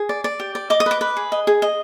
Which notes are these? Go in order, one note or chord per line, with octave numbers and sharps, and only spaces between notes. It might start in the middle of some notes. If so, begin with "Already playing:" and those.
Already playing: G#4
D5
D5
G4
D5
D#5 D6
D#6
B4 D6
B4
G#4
D#5
G#4
D#5